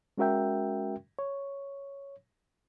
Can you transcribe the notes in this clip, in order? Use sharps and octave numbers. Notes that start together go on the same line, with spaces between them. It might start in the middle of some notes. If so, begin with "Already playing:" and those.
G#3 C#4 F#4 A#4 E5 G5
C#5